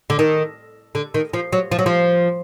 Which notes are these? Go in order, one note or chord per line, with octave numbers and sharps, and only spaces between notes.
D3
D#3
D3
D#3
F3
F#3
F3
F#3
F3